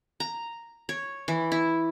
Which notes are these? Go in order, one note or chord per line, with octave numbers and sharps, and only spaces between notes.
A#5
C#5
E3
E4